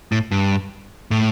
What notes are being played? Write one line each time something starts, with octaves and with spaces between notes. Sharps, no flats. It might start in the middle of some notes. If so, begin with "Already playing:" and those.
A2
G2
A2